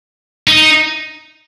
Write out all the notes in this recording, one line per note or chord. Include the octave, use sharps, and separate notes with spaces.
D#4